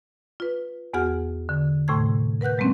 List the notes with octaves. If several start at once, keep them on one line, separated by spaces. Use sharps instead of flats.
F4 B4
E2 B3 F#4 G#4 F#5 F6
D3
D#2 A2 C3 A3 C6 G#6
A#4 B4 F#5 F#6 G6
F#3 G#3 A#3 C4 C#4